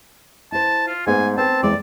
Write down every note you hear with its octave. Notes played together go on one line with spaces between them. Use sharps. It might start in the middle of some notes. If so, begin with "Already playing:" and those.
E4 C5 A5
F4
G#2 G#3 A3 B3 G#5
C4 B4 A5
E2 G#3 E4 D5